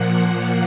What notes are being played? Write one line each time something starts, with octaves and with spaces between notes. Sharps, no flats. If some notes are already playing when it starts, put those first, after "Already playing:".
Already playing: A#2 F3 A#3 F#5